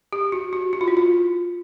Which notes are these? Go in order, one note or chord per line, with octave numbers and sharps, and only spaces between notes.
G4
F#4
F#4
F#4
F4
E4
F4